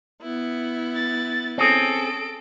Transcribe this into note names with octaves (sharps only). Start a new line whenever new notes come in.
B3 E4
A6
C4 C#4 G#4 A4 D7